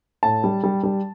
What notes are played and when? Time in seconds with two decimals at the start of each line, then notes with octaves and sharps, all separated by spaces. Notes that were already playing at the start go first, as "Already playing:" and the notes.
0.23 A2 A5
0.44 G3
0.64 G3
0.83 G3